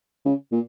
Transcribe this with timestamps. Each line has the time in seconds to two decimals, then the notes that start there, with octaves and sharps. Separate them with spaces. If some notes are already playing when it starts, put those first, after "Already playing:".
0.25 C#3
0.52 A#2